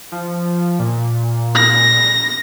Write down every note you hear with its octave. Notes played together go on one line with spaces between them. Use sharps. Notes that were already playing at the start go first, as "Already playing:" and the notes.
F3
A#2
A#6